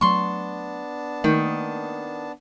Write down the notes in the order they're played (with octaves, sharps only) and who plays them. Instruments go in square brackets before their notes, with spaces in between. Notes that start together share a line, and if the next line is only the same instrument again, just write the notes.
[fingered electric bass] F#3 A3 [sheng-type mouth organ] B3 D4 A5 [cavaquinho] C6 C#6
[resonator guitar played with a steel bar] D#3 [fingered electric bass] A3 A#3